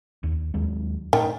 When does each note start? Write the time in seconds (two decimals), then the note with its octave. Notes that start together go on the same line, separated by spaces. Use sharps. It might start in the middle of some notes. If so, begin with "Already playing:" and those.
0.23 D#2
0.54 D#2 F#3 G#3
1.13 A2 D#3